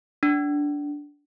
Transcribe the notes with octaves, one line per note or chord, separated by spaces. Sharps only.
D4